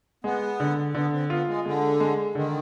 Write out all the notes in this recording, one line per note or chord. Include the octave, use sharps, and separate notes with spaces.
G#3 B3
D3
D3 B3
C4
B3 F4
G#3
D3 G#3
G#3
D3 D#3